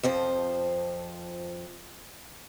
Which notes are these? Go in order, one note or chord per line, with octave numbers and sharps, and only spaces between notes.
F2 F3 C5